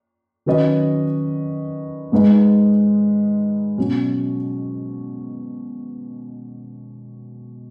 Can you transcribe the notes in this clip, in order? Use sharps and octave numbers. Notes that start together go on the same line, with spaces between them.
D#3 F#3 C#4 B4 D#5
G#2 G#3 D#4 B4 D#5
B2 F#3 C#4